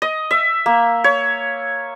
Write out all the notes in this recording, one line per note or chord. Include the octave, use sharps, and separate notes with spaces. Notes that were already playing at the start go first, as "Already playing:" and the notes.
D#5
E5
A#3
C#5